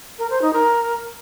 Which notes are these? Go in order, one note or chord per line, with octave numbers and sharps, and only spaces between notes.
A#4
C5
D#4
A#4